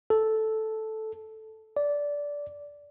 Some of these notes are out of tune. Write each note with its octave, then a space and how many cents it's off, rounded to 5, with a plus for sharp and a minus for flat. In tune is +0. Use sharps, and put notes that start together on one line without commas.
A4 -5
D5 -15